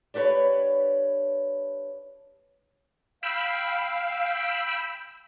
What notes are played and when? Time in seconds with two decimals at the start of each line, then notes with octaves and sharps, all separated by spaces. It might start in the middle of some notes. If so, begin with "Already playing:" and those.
0.14 D4 G4 B4 C#5
3.23 F5 G5 B5 E6